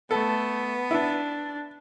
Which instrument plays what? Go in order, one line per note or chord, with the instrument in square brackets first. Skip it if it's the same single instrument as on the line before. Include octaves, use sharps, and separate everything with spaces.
[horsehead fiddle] A3 [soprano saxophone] B3 [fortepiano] A4
[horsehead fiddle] D4 [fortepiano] E4